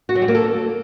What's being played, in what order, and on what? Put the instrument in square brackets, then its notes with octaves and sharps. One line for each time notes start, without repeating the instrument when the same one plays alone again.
[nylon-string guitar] F#4
F#3
G3
A#3
A4